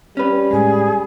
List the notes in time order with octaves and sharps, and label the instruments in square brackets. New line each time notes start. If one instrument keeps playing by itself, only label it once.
[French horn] G3 [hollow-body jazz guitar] C#4 B4
[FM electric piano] A2 G#3 [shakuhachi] G#4